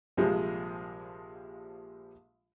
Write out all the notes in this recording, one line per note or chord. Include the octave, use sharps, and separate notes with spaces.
A#1 C3 F3 G3 G#3